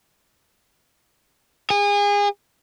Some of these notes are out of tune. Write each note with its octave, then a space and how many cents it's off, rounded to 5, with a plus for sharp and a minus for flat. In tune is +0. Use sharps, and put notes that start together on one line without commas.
G#4 -30